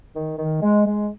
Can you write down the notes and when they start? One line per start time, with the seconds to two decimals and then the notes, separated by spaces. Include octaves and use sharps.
0.15 D#3
0.39 D#3
0.62 G#3
0.86 G#3